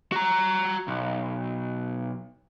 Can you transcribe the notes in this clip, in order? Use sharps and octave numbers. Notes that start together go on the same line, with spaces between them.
F#4 A#5
B1